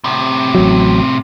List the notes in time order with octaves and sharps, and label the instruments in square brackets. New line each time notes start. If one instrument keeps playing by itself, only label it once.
[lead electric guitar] A2 C3
[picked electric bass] A1 F#3